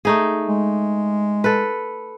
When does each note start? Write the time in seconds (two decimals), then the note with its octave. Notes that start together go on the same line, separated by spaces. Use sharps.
0.05 A3 D#4 G#4
0.47 G#3
1.44 A4 B4